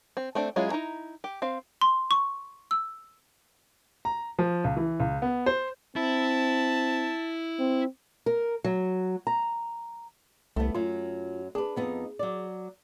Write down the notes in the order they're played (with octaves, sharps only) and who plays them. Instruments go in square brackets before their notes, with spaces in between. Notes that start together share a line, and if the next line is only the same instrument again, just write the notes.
[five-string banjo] C4
A3 C4 D4
F#3 G#3 C#4 E4 F4
D#4 E4 A#5
G4
C4 F5
[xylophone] C6
C#6
E6
[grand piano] A#5
F3
C#2
E3
C#2
B3
C5
[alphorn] C4 [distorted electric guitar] E4 [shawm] A5
[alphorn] C4
[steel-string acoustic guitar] A#4
F#3
A#5
[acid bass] C2 [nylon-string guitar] A3 B3
[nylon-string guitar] F#2 F#3 [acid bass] F4
[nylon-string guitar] D4 B4 [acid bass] G#4
[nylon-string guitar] F2 B3 D#4
F#3 D5